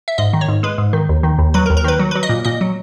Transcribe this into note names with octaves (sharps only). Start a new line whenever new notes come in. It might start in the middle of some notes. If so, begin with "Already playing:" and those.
E5
G#2 D#5
D#3
C#5
G#2
G#3 B4
G#2
D#3
D#2
D#3
D#2
F#3 B4
A#4
D#2
A#4
D#3 B4
F#3
B4
F#3
D#5
A#2
A#2 D#5
F#3